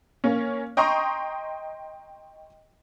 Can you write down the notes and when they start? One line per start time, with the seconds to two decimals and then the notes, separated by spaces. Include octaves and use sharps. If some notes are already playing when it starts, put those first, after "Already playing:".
0.24 A#3 C#4
0.77 D#5 G5 A#5 C6 C#6 D#6